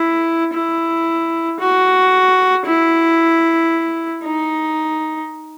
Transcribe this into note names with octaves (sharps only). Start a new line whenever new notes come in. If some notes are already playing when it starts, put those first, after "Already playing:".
Already playing: E4
E4
F#4
E4
D#4